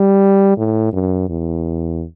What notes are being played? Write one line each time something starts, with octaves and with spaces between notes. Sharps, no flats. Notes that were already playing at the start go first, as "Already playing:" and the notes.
Already playing: G3
A2
F#2
E2